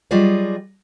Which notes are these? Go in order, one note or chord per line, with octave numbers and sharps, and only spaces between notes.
F#3 G3 F4 G#4 D5 D#5